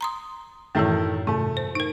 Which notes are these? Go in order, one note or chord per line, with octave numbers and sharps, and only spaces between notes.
A#5 C6 D#6
F#2 A2 D#3 E3 A3 E4
G#2 C3 A3
C5
D#4 A#4